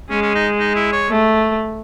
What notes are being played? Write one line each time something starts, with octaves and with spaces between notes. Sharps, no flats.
G#3 C#4
C#4
D#4
D#4
E4
C#5
A3